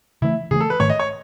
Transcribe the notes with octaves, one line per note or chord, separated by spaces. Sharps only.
C#3 E3 A3 E4
C#3 E3 A3 G#4
A4
B4
G#2 D#3 A3 C#5
D#5
C#5